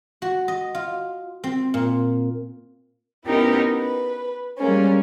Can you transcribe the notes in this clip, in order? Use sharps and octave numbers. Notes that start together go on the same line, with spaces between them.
F#4
D#5
F4
C4
A#2
B3 C#4 D#4 E4 G4 A#4
B4
G3 G#3 A#3 C#4